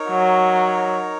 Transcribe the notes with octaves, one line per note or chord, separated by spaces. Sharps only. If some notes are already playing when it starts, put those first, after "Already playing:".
Already playing: D#4 A#4 C#5
F#3